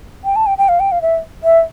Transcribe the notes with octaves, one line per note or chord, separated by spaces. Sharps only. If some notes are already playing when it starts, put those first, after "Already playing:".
G5
A5
G5
G5
F5
G5
F5
E5
E5